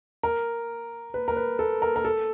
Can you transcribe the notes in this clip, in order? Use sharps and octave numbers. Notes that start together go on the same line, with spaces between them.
A#4
B4
A#4
B4
A4
A#4
A#4
A4